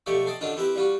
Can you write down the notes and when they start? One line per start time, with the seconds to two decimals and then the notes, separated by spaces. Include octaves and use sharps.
0.06 B1 F3 A3 G4 C#5 D5
0.26 D5 D#5 G5 A5 C6
0.41 F#2 D3 D#3 D4 F4
0.57 C4 E4 G4 A#4 B4
0.76 G3 F4 F#4